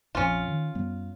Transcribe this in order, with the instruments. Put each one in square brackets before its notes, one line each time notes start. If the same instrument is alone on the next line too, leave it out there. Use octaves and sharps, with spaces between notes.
[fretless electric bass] A#1 F2 [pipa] C#4 F4
[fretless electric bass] D#3
F#2 G3 B3